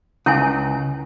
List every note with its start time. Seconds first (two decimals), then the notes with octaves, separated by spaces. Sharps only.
0.26 C#2 C#4 E4 G#5